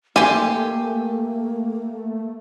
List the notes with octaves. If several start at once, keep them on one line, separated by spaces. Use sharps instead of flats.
A3 A#3 G4 G#5 C6